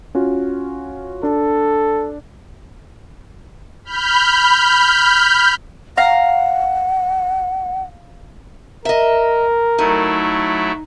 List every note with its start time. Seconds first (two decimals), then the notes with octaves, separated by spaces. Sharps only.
0.15 C#4 F4 F#4
1.23 D4 A4
3.85 B5 F6 G6
5.97 F5 F#5 A#5
8.85 A#4 D#5 E5
9.78 F#3 A3 D#4 E4